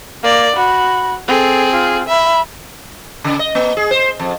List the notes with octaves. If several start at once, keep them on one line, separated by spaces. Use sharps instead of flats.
A#3 D5
F#4 B5
C4 G#4 A4
F4
E5 B5
C#3
D#5
A#3
G#4
C5
F2